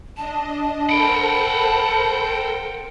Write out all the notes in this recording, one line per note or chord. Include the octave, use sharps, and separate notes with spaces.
D4 D#5 A5
A4 A#4 C5 F#5 G5 B5